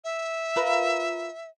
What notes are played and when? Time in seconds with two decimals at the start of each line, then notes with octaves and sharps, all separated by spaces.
0.04 E5
0.56 F4 A#4 B4